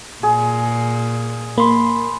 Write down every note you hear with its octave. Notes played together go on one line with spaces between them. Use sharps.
A#2 G#4
A#3 B5 C6